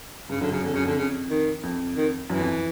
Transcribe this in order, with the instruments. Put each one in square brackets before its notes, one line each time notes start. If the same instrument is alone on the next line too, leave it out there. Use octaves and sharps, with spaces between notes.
[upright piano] G2 [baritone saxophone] C#3
[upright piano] F#2 [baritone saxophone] D3
[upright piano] F#2 [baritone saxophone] C#3
[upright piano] F2 [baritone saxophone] D3
[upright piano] F#2 [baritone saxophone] C#3
[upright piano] F2 [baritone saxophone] D3
[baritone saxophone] C#3
D#3
[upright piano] F2
[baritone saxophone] D#3
[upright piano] F#2 [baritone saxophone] E3
[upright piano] F2